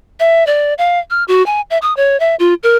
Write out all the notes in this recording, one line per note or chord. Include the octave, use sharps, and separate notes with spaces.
E5
D5
F5
F6
F#4
G#5
E5
D#6
C#5
E5
F4
A#4